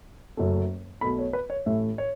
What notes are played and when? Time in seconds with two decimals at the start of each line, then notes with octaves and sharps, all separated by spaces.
0.37 F#1 F#2 F#3 A3
1.01 B1 B2 A3 B5
1.18 C#5
1.33 B4
1.50 C#5
1.66 A1 A2 A3 E5
1.98 C#5